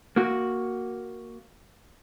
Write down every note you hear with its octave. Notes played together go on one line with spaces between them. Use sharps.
A#3 F#4